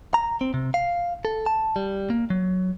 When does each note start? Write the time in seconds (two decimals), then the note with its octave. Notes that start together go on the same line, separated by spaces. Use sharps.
0.14 A#5
0.41 C4
0.54 C3
0.74 F5
1.25 A4
1.46 A5
1.76 G3
2.10 A#3
2.30 F#3